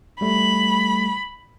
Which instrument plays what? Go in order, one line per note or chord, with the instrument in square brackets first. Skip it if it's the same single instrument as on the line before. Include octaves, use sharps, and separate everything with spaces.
[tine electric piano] G3 A3 [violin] B5